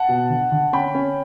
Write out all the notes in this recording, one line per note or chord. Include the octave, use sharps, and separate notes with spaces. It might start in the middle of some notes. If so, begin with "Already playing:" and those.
Already playing: F#5 A5
B2
D3
D3
C#4 G5 B5
C#4